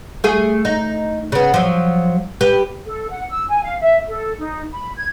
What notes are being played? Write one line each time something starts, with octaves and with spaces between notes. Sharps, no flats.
A3 G#4
D#4
C#3 B3
F3 F#3
G4 B4
A4
F#5
E6
G#5
F5
E5
A4
D#4
B5
G#6